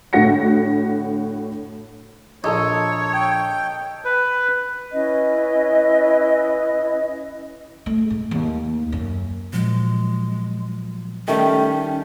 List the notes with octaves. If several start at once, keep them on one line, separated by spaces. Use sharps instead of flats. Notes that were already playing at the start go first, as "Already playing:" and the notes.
A2 D3 F#4 A#6 C#7
A#1 A4 C#5 D#5
G5
B4
C#4 E4 B4 D#5
A3
G#2
D#2
F#2
A#2 F3 F#3 G#3
D#3 G3 A3 C#4